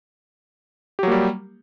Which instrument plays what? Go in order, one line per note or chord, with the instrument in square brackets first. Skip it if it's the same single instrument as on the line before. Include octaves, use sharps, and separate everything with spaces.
[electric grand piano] G4
F#3
A#3
G3